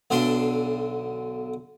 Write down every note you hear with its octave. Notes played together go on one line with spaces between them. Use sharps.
B1 D3 D4 F5 C6